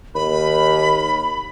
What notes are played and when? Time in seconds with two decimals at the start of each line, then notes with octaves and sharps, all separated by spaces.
0.15 D#2 B5